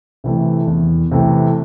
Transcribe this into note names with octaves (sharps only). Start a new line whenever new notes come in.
C3 E3 A3
E2
C3 E3 A3